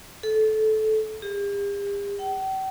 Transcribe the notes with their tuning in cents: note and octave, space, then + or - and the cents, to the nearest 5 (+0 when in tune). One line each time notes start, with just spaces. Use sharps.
A4 -20
G4 +45
G5 -45